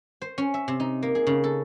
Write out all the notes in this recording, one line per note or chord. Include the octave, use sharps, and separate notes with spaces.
C5
C#4
E5
C3
D#4
A#3
G#4
C#3
A4